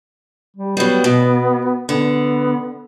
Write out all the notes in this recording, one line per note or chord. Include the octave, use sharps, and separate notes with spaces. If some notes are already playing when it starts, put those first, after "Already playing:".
G3
F#3 G3 B3
B2
D3 B3